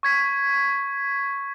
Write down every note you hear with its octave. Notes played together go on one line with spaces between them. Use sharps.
C#6 G#6 B6